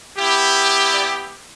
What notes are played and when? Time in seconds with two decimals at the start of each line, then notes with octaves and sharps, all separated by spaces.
0.18 B3 E4 G4
0.91 D5